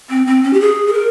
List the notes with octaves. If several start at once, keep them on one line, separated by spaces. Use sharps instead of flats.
C4
C4
C#4
G4
G#4
G#4
A#4